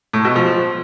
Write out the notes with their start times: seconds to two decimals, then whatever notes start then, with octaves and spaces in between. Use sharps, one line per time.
0.14 A2
0.25 B2
0.36 F3